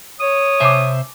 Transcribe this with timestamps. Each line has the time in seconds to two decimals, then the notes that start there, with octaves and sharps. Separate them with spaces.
0.20 C#5 D#6
0.60 C3 C5 E5 G#5 A5 D6